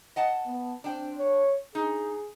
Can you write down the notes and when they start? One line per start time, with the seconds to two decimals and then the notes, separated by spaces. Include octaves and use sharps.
0.16 D#5 F#5 A5
0.45 B3
0.84 C4 D4 G5
1.18 C#5
1.75 D#4 G#4